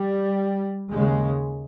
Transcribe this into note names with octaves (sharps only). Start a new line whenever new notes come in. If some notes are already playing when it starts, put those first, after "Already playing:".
Already playing: G3
D#2 C#3 G#3